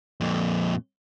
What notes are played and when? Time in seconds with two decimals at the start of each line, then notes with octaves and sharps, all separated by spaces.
0.21 F2 A#2